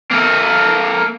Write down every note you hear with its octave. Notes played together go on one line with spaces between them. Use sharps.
A#3 A4